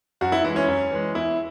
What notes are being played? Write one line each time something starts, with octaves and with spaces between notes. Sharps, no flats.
F#2 F#4
E4
E3 G#3 E4
C#4
F#2
E3 G#3
E2 E4